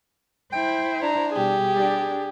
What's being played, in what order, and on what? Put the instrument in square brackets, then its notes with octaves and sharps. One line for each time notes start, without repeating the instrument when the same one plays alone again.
[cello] E4 C5 [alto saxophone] G5
[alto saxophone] D4 [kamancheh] A#5
[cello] B2 G3 [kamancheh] G4 G#4
[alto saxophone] G3 [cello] D4